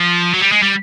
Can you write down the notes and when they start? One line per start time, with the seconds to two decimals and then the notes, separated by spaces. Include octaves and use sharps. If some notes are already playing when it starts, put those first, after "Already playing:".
Already playing: F3
0.34 F#3
0.41 G3
0.52 G#3
0.62 G3